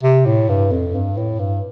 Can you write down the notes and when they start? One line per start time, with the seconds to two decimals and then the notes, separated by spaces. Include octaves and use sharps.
0.03 C3
0.26 A2
0.49 G2
0.72 F2
0.95 G2
1.17 A2
1.39 G2